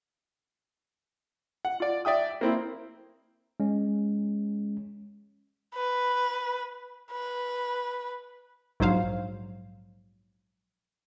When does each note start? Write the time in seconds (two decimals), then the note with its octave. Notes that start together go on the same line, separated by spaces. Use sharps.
1.65 F#5
1.80 F4 D5
2.05 D5 E5 G5 D#6
2.41 A#3 C4 E4
3.60 G#3 C#4
5.75 B4
7.12 B4
8.80 A#1 G#2 F#3 C5 F5